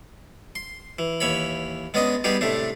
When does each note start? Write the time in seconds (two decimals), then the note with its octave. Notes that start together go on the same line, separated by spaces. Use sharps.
0.55 C6
0.99 E3
1.20 D#2 E3 C#5 B5
1.94 G#3 B3 C#4 D4 D#5
2.24 G3 B3 D#4 G4 G#4
2.41 A2 C3 A3 D4